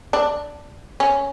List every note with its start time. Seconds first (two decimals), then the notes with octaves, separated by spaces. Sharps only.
0.13 D4
1.00 C#4